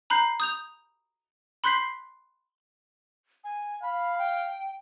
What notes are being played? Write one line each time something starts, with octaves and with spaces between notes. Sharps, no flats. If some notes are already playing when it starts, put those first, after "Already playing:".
A#5 B5 F#6 G6 C7
D#6 G6 F7
B5 C6 F#6 G6 B6 C7
G#5
F5 B5
G5